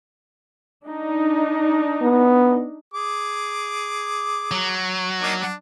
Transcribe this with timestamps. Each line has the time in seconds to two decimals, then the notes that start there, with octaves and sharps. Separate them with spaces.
0.86 D4 D#4
2.02 B3
2.94 G#4 D6
4.51 F#3
5.22 A#3 D4 D#4
5.40 D4